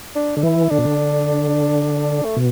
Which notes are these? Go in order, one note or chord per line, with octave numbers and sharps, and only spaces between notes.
D4
D3 D4
E3 E4
D3 D4
B2
D3
A3
B2